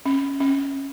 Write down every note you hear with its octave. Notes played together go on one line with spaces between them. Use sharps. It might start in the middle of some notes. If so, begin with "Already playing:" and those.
C#4
C#4